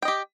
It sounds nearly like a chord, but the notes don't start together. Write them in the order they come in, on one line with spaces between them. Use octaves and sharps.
G5 D#5 G4